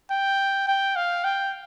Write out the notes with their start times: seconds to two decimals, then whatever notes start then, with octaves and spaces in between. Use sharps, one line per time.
0.11 G5
0.68 G5
0.96 F5
1.25 G5